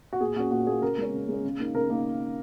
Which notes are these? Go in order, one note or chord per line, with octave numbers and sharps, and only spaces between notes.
F#4
A#2 G#4
A#3 C#4 F#4
A#2 F#4
A#3 C#4 G#4
C#3 A#4
G#3 C#4
C#3
G#3 C#4
C#3
A#3 D#4
C#3 A#4
A#3 D#4